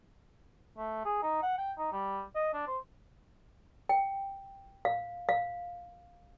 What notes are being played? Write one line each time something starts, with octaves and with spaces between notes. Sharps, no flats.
A3
G#4
D#4
F#5
G5
D#4
G3
D#5
D4
C5
G5
F5
F5